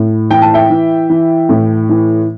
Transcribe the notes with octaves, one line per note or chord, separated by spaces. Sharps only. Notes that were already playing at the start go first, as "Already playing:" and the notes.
Already playing: A2
E3 G5
A5
E5 G5
E3
E3
A2
E3